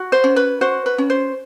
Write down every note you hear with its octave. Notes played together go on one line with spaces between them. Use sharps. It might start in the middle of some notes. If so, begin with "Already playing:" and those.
Already playing: F#4
C5
C#4
B4
F#4 C5
B4
C#4
C5